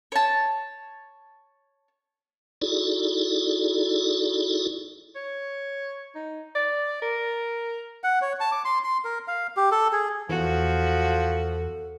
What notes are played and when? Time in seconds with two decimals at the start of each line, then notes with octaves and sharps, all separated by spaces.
0.12 C#5 A5
2.62 D#4 E4 F#4 G#4 A4 D5
5.16 C#5
6.15 D#4
6.55 D5
7.02 A#4
8.04 F#5
8.22 C#5
8.40 A5
8.52 D6
8.65 C6
8.84 C6
9.05 A#4
9.28 F5
9.57 G4
9.72 A4
9.93 G#4
10.29 E2 F3 F#4 A4